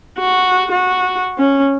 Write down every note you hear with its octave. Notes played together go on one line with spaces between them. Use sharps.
F#4
F#4
C#4